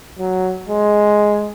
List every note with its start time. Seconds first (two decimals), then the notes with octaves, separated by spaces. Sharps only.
0.19 F#3
0.69 G#3